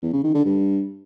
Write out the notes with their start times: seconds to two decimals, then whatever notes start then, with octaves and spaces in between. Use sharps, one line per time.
0.02 E2
0.13 C#3
0.24 D#3
0.34 D3
0.45 G2